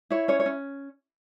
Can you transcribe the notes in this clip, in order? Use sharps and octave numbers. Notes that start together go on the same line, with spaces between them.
E4 C#5
C#4 C#5
C#5
C#4